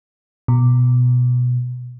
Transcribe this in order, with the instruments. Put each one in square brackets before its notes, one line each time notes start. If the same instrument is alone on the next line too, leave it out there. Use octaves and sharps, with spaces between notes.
[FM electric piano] B2